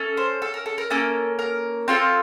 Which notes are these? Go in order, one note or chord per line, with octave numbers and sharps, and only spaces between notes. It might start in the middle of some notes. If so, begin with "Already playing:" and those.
Already playing: C#4 A4
C5
A4
A#4
A4
A#4
A#3 C#4 A4
A#4
C4 F4 A4